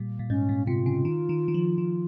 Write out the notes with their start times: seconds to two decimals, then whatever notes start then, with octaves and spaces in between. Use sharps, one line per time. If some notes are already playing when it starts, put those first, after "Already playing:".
Already playing: A#2 G3
0.19 A#2
0.30 G#2 C#4
0.49 A#2
0.67 C3 F4
0.86 C#3
1.05 D#3
1.29 D#3
1.48 D#3
1.54 F3
1.78 D#3